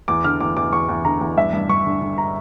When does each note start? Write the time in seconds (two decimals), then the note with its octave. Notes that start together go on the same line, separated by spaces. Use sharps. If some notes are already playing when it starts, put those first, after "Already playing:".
0.08 E2 D6
0.24 D3 F6
0.40 E2 D6
0.57 E2 D6
0.72 E2 C#6
0.89 E2
1.05 D3 A#5
1.21 E2
1.37 G2 E5
1.53 G2
1.69 G2 C#6
1.85 D3
2.01 D3
2.18 A#5